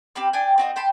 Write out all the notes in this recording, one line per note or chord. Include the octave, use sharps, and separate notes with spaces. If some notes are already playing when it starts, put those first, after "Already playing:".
C4 G4 B5 F6
D4 G5 G#5
C4 F#4 D#5
G5 A5 B5 C6